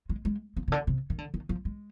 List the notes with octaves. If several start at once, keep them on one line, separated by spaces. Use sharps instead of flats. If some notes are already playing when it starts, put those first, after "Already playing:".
G#3
G#3
C4
C3
D3
C3
D#3
D3
D#3
F3
G#3